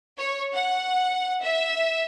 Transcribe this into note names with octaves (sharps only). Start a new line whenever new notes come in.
C#5
F#5
E5